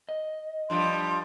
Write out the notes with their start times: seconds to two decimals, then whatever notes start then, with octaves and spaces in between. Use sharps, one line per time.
0.09 D#5
0.70 G2 F3 G3 C6